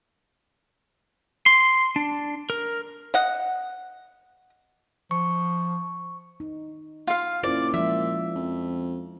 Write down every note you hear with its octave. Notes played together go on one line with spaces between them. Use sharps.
C6
D4
A#4
D#5 F#5
F3 C#6
D#4
F4 F5
A#2 C#4 E4 C5 D5
F3 G#3 E5
F2